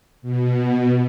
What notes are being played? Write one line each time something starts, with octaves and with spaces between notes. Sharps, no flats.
B2